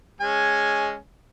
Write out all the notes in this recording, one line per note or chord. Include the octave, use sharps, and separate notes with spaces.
G#3 C#4 G#5